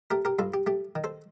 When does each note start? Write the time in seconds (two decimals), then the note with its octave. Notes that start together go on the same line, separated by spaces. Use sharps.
0.11 A3 G4 A#4
0.25 G4 A#4
0.39 G2 F4 A4
0.54 G4
0.67 A3 G4
0.95 D#3
1.04 A4 C5